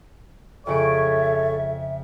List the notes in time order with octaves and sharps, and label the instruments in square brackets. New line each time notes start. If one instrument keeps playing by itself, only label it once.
[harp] F2 C#3 D7 [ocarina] A4 [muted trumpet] C#5 [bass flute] E5